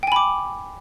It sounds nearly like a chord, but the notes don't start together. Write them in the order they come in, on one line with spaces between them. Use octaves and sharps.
G5 G#5 B5 D6